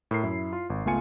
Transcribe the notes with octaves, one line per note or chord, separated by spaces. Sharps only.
A2 A#4 C7
F#2 E4
F4
G#1
C#2 A3 B3 F4 G#5 C#7